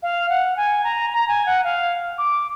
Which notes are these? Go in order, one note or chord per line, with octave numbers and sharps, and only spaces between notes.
F5
F#5
G#5
A#5
A#5
G#5
F#5
F5
D6